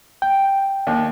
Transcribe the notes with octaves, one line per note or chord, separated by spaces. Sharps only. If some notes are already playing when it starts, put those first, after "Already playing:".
G5
D#2